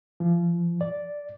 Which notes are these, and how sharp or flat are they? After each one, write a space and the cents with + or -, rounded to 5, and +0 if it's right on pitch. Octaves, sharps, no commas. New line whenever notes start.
F3 -30
D5 -5